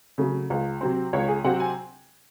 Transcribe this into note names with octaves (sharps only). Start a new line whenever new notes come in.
C#3 F#3 A3
C#2
C3 F#3 C4
C#2 C#5
G#4
C3 F#3 C4 F#5
G#5